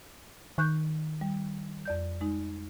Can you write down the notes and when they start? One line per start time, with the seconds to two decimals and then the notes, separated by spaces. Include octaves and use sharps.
0.58 D#3 C#6 F#6 G6
1.21 G3
1.85 F2 D5 G6
2.21 G#3 D#4